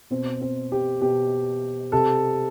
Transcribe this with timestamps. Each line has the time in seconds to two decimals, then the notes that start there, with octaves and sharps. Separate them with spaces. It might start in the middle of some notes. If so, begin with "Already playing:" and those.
0.11 B2 C4
0.41 C4
0.72 G4
1.01 B2 G4
1.92 C3 A4